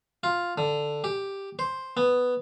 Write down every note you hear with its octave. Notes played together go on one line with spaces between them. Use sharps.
F4
D3
G4
C5
B3